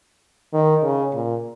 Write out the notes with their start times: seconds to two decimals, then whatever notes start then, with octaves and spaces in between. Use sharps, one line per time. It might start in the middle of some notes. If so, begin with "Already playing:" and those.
0.53 D#3
0.83 C#3
1.14 A#2